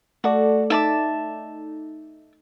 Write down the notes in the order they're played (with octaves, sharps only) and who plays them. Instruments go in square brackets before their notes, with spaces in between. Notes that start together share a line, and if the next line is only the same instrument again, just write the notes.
[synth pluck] A3 A4 D5 [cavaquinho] F#4
[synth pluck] D#4 [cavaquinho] E5 A5 D6